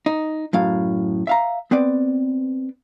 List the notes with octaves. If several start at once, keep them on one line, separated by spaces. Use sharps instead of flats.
D#4
F#2 A2 F5
E5 F5 A#5
B3 C4 B4 D5